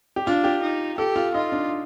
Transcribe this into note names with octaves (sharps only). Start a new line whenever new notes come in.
G4
D4 F4
G4
D#4
G4 A4
F4
D#4 F4
D4